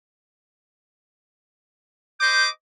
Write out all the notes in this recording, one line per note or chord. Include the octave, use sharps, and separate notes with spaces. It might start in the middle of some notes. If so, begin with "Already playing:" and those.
C5 D#5 D6 G6